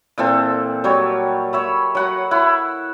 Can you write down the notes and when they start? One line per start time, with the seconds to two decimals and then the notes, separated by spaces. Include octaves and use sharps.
0.18 A#2 E3 C4 A4
0.84 F#3 G3 C#5
1.53 C#5 E5 B5
1.95 F#3 F#5 B5
2.31 E4 F#5